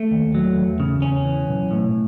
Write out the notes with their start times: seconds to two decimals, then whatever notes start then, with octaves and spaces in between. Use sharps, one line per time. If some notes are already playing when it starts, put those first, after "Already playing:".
Already playing: A3
0.11 D#2
0.35 F#3
0.56 E2
0.80 C#3
1.02 E2 C#4
1.25 E3
1.48 B1
1.71 A2